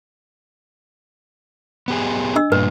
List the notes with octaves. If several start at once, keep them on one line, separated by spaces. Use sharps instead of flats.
B3 G4 G#4
D4 D#5 E6
G2 A#2 B4